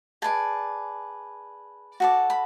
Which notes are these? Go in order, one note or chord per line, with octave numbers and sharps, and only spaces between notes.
G#4 B4 D5 A5
F#4 A4 D5
B5